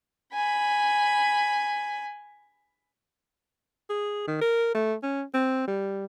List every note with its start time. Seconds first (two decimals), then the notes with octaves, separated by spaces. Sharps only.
0.33 G#5 B5
3.90 G#4
4.27 D#3
4.41 A#4
4.75 A3
5.03 C#4
5.34 C4
5.67 G3